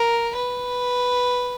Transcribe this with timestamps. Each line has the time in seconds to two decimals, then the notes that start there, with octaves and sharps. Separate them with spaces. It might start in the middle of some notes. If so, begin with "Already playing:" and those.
Already playing: A#4
0.35 B4